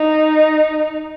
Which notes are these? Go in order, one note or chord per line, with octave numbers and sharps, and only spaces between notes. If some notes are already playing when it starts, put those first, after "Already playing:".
Already playing: D#4